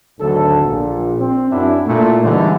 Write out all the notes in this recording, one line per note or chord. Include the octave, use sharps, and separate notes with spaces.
G#1 D2 D3 F#3 A4
A#1 A#2
C4
F#2 D4 E4
A#2 A3 E4
D3 E3 G3 G#3 C#4 D#4